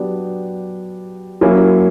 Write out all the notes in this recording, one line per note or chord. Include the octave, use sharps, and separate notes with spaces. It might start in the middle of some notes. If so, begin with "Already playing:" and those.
Already playing: F#3 B3 D4 G4
F#3 A#3 C#4 E4